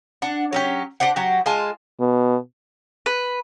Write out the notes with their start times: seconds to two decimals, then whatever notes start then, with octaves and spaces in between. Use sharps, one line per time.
0.22 D4 F#5
0.53 F#3 C#4 G4
1.00 D4 G4 C5 F#5
1.16 F#3 F#4 G4
1.46 G#3 F4 G#5 A5
2.00 B2
3.06 B4